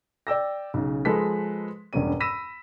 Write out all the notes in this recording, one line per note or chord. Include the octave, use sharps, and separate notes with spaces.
D5 G5 E6 A#6
B1 C#3
F3 G#3 G#4 A4 B4 B6
E1 G2 B3 C#4 D#7
B5 E6 A#6 B6 D#7 E7